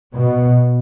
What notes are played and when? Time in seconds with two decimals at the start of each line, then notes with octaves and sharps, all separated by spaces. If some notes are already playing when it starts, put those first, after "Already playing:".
0.14 B2